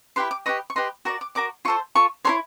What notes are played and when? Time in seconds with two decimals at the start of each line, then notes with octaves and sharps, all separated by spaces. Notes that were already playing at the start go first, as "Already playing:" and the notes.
0.16 E4 G4 B4 C6
0.31 D6
0.46 G4 B4 D#5 C#6
0.70 C#6
0.76 G4 B4 D#5 C6
1.05 F#4 A#4 D5 C#6
1.21 D6
1.35 F#4 A#4 D5 D6
1.65 F4 A4 C5 C#6
1.95 F4 A4 C#6
2.25 E4 A4 C#5 C6